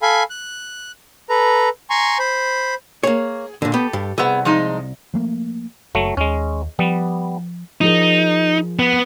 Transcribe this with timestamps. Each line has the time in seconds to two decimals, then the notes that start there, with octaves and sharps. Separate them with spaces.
0.02 A4 F5 G#5 B5
0.30 F#6
1.29 A4 B4 A#5
1.90 G#5 A#5 C6 C#6
2.19 C5 B5
3.03 A#3 G#4 C#5
3.62 A#2 D3
3.74 B3 G4 A4
3.93 G2
4.18 C2 B3 G#4 E5
4.45 F3 G#3 D#4
5.14 F3 A3 A#3
5.95 F#1 F#3 A3
6.17 D#2 G#3 C#4
6.79 F3 G3 B3
7.81 F3 D#4 G#4 A#4
8.79 B3